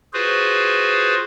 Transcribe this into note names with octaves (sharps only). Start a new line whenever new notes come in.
F4 F#4 G#4 B4 C5